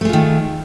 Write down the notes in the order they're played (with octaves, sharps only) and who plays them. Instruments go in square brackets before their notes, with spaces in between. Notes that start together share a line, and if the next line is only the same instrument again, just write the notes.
[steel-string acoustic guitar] A3
G#3
F4
D#3